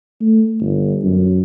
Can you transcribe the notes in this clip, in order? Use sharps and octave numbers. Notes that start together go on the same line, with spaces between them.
A3
G1
F#2